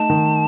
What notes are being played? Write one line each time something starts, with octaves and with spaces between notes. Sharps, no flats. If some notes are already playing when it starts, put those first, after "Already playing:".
Already playing: A3 D#4 A5
D#3